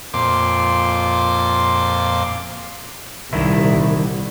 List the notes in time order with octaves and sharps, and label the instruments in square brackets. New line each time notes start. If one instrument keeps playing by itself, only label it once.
[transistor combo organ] F2 A#2 C6 D6
[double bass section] C2 A#2 G3 [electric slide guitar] D3 D#3 E4